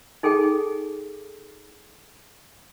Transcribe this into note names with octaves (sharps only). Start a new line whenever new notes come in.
D#4 G#4 A4 G5